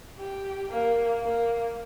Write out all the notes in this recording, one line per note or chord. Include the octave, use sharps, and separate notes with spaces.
G4
A#3
A#3